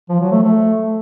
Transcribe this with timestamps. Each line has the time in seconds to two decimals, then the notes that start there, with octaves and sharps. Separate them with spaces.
0.09 F3
0.20 F#3
0.31 A3
0.43 A3